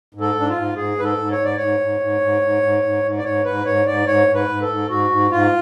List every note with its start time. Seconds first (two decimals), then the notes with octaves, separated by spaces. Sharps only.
0.14 G#2
0.21 A4
0.35 G#2 D4
0.49 F4
0.56 G#2
0.76 G#2 G#4
0.97 G#2 B4
1.04 A4
1.18 G#2
1.32 C#5
1.38 G#2
1.44 D5
1.56 G#2 C#5
1.80 G#2
2.00 G#2
2.21 G#2
2.41 G#2
2.62 G#2
2.83 G#2
3.03 G#2
3.18 D5
3.24 G#2 C#5
3.45 G#2 B4
3.66 G#2 C#5
3.86 G#2 D5
4.07 G#2 C#5
4.27 G#2
4.35 B4
4.49 G#2
4.62 A4
4.69 G#2
4.89 G#2 F#4
5.10 G#2
5.31 G#2 F4